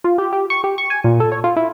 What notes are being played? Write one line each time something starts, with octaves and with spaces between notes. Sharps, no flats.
F4
G4
G4
C#6
G4
C#6
G#5
A#2
A4
C#5
F4
E4